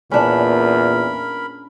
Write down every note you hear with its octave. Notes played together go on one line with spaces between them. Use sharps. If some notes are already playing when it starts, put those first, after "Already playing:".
E2 A#2 C#4 D4 A#4 B5